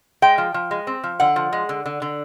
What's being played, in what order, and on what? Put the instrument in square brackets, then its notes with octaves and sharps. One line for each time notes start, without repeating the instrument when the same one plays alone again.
[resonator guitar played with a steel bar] G#3 G5
F3
F3
G#3
C4
F3
D3 F#5
F3
G#3
D3
D3
D3